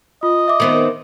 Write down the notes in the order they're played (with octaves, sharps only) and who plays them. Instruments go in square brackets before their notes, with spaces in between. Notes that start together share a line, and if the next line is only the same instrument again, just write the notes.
[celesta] F4 [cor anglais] D#5
[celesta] E5 D6
[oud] D#3 B3 C4